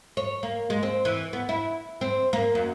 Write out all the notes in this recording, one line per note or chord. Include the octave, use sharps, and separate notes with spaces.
C#5
A#3
G#3
C4
E3
B3
E4
C4
A#3
F#2